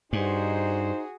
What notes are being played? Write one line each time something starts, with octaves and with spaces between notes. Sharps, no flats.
G2 D#4 F#4 G#4 C5